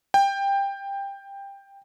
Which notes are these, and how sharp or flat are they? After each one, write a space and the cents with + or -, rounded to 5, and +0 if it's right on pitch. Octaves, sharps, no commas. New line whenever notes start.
G5 +15